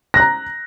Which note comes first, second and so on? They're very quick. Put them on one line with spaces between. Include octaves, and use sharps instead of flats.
A#6 F#6 A#5